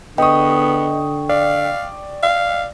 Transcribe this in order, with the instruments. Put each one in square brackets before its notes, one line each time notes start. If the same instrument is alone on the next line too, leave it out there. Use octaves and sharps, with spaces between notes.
[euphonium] D3 [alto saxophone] B3 [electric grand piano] D#5 D#6 [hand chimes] G5 C#6
[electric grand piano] D5 [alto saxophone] F5
[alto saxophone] F5